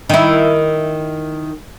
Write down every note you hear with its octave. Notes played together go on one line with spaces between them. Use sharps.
D#3 E4